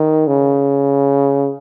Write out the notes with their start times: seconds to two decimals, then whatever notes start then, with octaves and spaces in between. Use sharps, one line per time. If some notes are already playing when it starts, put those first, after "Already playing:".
Already playing: D#3
0.27 C#3